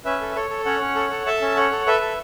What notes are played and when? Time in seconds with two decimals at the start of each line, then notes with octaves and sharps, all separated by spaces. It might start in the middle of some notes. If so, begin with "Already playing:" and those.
0.05 C#4 B4 E5
0.21 A4
0.35 A4 C#5
0.50 A4
0.65 C#4 C#5 F#5
0.81 C#4
0.95 A4
1.11 A4
1.26 A4 E5 A5
1.41 C#4
1.56 A4 C#5 F#5
1.72 A4
1.86 A4 B4 E5
2.01 A4